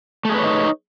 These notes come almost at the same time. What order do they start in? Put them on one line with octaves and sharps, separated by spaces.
A3 G#4 B4 C#5 D#4